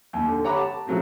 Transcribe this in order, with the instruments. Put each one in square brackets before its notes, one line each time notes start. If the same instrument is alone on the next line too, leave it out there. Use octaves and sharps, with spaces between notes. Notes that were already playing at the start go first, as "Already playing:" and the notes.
[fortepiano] D#2
D3
G4 C#5 F#5 A#5 B5 D6
A5
C#3 F3 F#3 A3 C4